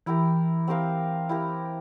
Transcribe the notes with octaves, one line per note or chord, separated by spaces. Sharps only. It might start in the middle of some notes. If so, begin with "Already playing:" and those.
E3 E4 G4 A#4
C4 G4 A#4 F5
E4 G4 A#4